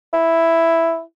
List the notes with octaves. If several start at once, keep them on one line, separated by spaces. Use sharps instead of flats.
E4